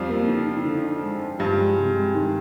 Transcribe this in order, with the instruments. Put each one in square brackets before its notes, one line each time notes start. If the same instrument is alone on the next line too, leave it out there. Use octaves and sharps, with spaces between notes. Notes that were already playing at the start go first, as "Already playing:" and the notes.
Already playing: [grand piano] F2 F3 [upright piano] G3
[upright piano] A#3
D3
D3
D3
D#4
G#3
G#3
[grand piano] G2 G3 [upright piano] F3
[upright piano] G#3
C3
G#3
D#3